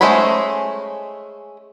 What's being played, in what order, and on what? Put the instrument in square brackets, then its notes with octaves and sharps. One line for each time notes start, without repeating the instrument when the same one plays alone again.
[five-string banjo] G#3 A3 C#4 C5 B5